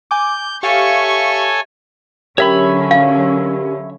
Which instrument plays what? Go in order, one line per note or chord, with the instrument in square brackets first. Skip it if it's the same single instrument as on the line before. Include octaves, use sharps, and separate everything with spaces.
[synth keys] G#5 D6 [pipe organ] G6
[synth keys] G4 F5 [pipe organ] A4 C#5 G#5 [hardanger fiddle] E5 C#6
[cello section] D3 F#3 C#4 [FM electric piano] G4 A#4 [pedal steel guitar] C#5 E5 B5
[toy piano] F5